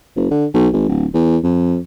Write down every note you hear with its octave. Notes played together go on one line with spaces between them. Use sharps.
F#1
D3
B1
G#1
D1
E2
F2